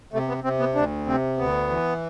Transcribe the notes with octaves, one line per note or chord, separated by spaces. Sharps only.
C3 A3
B3
C3 C4
B3
D2 D4
C3 C4
D2 B3
E3